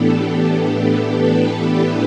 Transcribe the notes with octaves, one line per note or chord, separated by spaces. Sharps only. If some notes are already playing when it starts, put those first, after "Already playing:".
Already playing: A2 E3 B3 D4 G4 A4
A4
B4